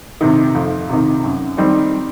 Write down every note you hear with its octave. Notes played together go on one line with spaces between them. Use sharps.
C3 D#3
F2
C3 D#3
F#2
D#3 G3 C4 D#4